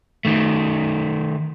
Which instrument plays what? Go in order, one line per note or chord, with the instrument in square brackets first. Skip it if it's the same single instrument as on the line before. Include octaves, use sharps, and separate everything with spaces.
[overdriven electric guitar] D#3 A3